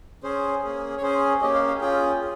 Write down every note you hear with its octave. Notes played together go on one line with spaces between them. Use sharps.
C#4 G#4 C5
A#3 C#4 G#4
C#5
C#4 G#4 C5
A#3 C#4 G4 D#5
F5
F5
C#4 F4 G#4 G5
G#4